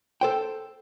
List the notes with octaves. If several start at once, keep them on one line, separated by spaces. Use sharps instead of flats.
A4 C5 G5